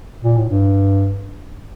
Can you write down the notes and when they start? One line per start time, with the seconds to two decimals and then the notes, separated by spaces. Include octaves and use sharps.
0.23 A#2
0.37 A2
0.50 G2